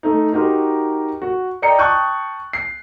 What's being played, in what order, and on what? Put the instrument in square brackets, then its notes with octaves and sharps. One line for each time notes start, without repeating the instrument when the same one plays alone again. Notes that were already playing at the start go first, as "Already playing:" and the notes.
[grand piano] A3 D#4
D#4 F#4 G4 A#4 C6
F#4
D5 D#5 G5 A#5 C#7
G5 A5 C#6 D#6 F#6 G6
C7